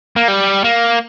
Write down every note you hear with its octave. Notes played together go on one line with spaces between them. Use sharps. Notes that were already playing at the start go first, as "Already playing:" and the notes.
A#3
G3
A#3